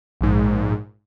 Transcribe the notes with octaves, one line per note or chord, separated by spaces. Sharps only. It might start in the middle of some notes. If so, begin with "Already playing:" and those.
A#1 G#2